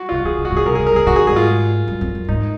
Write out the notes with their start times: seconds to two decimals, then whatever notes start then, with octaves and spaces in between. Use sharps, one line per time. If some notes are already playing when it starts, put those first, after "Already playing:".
Already playing: F#4
0.09 F4
0.11 C#3 F#4
0.25 D#3 G#4
0.38 C#3
0.45 F#4
0.52 C#3 G#4
0.66 C3 A#4
0.75 C#3 G#4
0.87 A#4
0.93 C#3 G#4
1.07 D#3 F#4
1.16 G#4
1.27 G#2 G#4
1.36 F4
1.88 F#2
2.01 F2
2.15 F#2
2.28 G#2 D#4